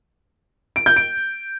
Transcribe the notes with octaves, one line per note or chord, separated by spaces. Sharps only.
D7
G6
D7